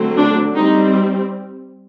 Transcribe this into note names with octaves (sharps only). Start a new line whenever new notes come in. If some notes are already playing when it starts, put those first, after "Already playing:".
Already playing: D3 F#3 A3 C4
D4
G3 C4 D#4